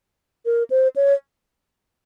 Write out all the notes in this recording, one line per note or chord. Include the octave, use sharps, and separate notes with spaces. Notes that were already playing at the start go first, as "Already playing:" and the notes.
A#4
C5
C#5